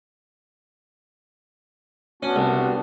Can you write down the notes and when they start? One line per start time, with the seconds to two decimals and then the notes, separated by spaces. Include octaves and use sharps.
2.23 B3 C#4 D4 F#4
2.36 C2